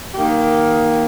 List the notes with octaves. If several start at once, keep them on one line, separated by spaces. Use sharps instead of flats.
D#3 A#3 G4